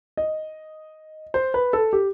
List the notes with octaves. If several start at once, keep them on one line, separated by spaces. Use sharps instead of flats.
D#5
C5
B4
A4
G4